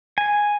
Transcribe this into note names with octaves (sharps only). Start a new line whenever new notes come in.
G#5